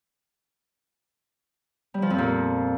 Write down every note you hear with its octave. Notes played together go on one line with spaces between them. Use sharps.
G3
F3
F2
A#2